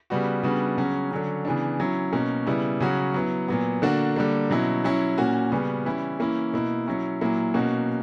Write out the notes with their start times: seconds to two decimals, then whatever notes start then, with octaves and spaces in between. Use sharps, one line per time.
0.10 C#3 G3 B3 F#4
0.43 C#3 G3 B3 D4 F#4
0.78 C#3 F#3 C#4 F#4
1.11 D3 F#3 C#4
1.45 C#3 E3 B3 D4
1.80 F#3 C#4 E4
2.13 B2 A#3 C#4
2.47 C#3 G3 B3 E4
2.80 C#3 F#3 C#4 F#4
3.14 F#3 B3 E4
3.48 A#2 F#3 B3
3.82 D3 A#3 D4 F#4
4.16 D3 G3 A#3
4.50 B2 F#3 C#4 E4
4.84 F#3 C#4 E4
5.18 A#2 A#3 C#4 F#4
5.52 C#3 G3 B3 F#4
5.85 E3 G3 C#4 E4
6.19 E3 A#3 C#4 E4
6.53 B2 A#3 E4
6.87 F#3 C#4 E4
7.21 A#2 F#3 A#3 E4
7.54 B2 A#3 C#4 F#4